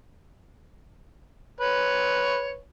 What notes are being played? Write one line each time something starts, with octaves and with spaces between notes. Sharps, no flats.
B4 C#5